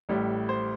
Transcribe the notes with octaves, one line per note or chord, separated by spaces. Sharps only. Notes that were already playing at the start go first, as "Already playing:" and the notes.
A1 A2 G3
C5